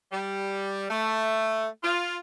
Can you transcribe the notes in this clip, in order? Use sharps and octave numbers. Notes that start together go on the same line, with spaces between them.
G3
A3
F4